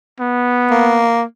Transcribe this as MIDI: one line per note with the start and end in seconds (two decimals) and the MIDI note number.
0.20 1.04 59
0.70 1.23 58